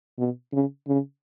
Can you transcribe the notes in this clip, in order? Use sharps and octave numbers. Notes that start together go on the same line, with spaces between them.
B2
C#3
C#3